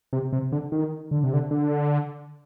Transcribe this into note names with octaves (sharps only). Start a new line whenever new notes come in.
C3
C3
D3
D#3
D3
C3
D3
D3